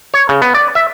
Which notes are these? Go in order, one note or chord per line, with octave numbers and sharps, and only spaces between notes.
C#5
C#3
B3
D5
E5